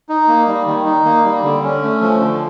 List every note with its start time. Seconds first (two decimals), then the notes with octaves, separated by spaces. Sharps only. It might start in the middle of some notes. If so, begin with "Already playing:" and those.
0.09 D#4
0.28 A#3
0.47 G3
0.66 D#3
0.85 D#4
1.05 A#3
1.24 G3
1.43 D3
1.63 C#4
1.82 A3
2.01 F3
2.21 D3